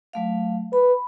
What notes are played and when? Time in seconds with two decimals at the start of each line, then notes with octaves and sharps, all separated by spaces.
0.13 F#3 A3 F5
0.73 B4 B5